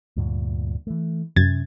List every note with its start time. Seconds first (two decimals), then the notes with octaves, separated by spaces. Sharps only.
0.17 D2 G2 A#2
0.87 E3 A3
1.36 F#2 C3 C#4 G#6 A6